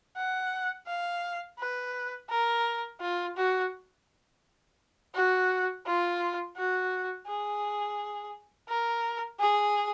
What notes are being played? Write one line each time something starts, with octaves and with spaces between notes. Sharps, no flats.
F#5
F5
B4
A#4
F4
F#4
F#4
F4
F#4
G#4
A#4
G#4